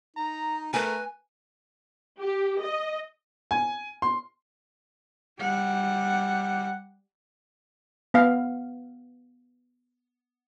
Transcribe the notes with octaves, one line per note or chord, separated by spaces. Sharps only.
D#4 A#5
A3 A#4 B4 G#5
G4
D#5
G#5
C6
G3 F#5
B3 F5